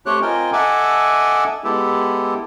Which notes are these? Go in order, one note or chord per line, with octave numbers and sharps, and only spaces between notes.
A3 C4 G4 C#5 F#6
C4 F4 A#4 D#5 G5 G#5
A4 D#5 E5 F#5 G#5 D6
G#3 B3 E4 G4 A4